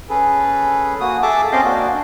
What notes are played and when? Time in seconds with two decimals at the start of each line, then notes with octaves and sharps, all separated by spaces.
0.09 C#4 G#4 A4 B4
1.00 A#3 F#4 D#6
1.22 G#4 A4 E5 A5 D6
1.52 C4 C#4 D#5 F5 G5
1.65 A#3 D4 F#4